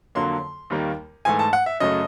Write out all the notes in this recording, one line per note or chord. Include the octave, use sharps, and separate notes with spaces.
F2 D3 F#3 A#3 C6
D#2 D#3 G3 A#3
G#2 E3 A3 G#5
A5
F#5
E5
F#2 C#3 F#3 A3 D#5